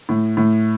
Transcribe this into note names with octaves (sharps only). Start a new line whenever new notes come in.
A2
A2